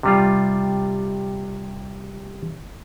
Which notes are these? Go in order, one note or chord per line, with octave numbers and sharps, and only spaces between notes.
C3 G3 F4